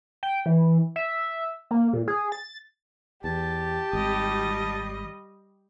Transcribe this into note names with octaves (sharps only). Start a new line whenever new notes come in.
G5
E3
E5
A#3
A#2
G#4
A6
E2 G4 A5
G#1 G3 D#5